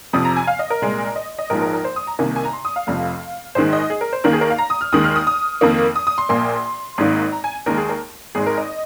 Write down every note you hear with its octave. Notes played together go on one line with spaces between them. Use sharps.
F2 C3 F3 D#6
A#5
G#5
F5
D#5
A#4
C2 A#2 G#3
D#5
D#5
A#1 G#2 F3 G#3 A#4
A#4
A#4
C5
D#6
A#5
C2 C3 D#3 A#3 G#5
G#5
A#5
C6
D#6
F5
F1 F2 C3 F3
A#1 G#2 D#3 G#3 C5
D#5
G#4
A#4
C5
D#2 D#3 A#3 A#4
G#4
A#4
F5
A#5
D#6
F6
D#2 D#3 G#3 D#6
F6
D#6
D#6
F2 D#3 A#3
D#6
D#6
C6
A#1 A#2 A#3 C6
G#1 G#2 D#3 A#3
A#5
G#5
D#2 D#3 G#3 A#4
G#4
A#4
G#1 G#2 G#3 G#4
A#4
D#5